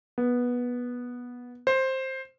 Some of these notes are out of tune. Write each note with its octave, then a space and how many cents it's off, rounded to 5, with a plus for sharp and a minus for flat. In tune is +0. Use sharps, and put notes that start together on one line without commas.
B3 -15
C5 +10